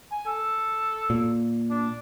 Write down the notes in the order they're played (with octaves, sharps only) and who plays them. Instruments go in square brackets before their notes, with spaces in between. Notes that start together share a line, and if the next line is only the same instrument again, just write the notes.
[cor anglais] G#5
A4
[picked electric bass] A#2
[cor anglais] D4